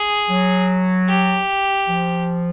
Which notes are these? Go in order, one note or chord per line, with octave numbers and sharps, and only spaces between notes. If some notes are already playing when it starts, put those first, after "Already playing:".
Already playing: G#4
F#3
G4
F3